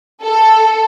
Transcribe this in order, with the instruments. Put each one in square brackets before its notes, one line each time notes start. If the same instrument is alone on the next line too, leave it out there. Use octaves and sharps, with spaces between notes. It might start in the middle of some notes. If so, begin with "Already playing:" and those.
[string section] A4